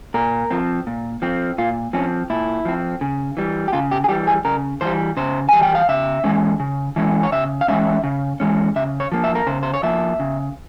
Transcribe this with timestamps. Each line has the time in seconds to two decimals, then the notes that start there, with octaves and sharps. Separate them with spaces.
0.14 A#2 A#4
0.51 F3 C4
0.87 A#2
1.22 F3 C4
1.58 A#2 F4
1.93 F3 C4 C#4
2.30 A#2 E4
2.65 F3 C4
3.01 C#3
3.37 E3 G3
3.68 G4
3.73 C#3 F4
3.91 G4
4.04 G#4
4.09 E3 G3 G4
4.27 G#4
4.45 C#3 A#4
4.81 E3 G3 C5
5.17 C#3 C5
5.49 E3 G3 G#5
5.63 G5
5.75 F5
5.89 C#3 E5
6.24 E3 G#3 C#4
6.60 C#3
6.96 E3 G#3 C#4
7.23 C#5
7.32 C#3 E5
7.61 F5
7.68 E3 G#3 C#4 E5
8.04 C#3
8.40 E3 G#3 C#4
8.76 C#3 E5
9.00 C#5
9.12 F3 A#3
9.24 E5
9.35 A#4
9.47 C#3 C5
9.63 C5
9.74 C#5
9.83 F3 A#3 E5
10.20 C#3